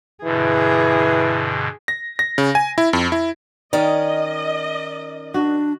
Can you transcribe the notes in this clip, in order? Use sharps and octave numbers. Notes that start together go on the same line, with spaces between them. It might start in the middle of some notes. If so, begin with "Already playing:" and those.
G2 B2 D3 E3 G#4
A#6
A#6
C#3
G#5
E4
F2
E4
D#3 C#4 A#4 D5 D#5
D4 F#4